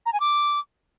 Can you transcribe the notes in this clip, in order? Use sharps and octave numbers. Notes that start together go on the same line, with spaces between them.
A#5
G#5
D6